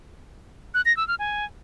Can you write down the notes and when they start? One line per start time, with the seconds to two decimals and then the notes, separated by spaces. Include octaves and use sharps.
0.74 F#6
0.86 A#6
0.97 E6
1.08 F6
1.19 G#5